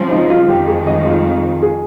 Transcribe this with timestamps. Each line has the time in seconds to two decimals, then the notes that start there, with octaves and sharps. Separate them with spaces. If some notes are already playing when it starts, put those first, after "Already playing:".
Already playing: C#3 F3 G#3 C4
0.11 D#4
0.30 F4
0.49 F2 D#3 G#3 G4
0.68 G#4
0.87 D#5
1.06 F4
1.63 G#4